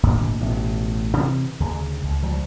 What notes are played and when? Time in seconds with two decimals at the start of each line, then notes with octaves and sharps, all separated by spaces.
0.03 D1 G#1 D2 A#2
0.40 A1 B2 A3
1.17 C3 E3
1.60 D2 C#3
2.04 C#2
2.22 C#2 F3 G3